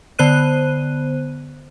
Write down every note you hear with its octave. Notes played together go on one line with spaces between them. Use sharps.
D3 B3 C5 F#6 D#7